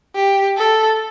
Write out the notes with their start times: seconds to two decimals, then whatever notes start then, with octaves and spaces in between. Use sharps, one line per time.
0.15 G4
0.57 A4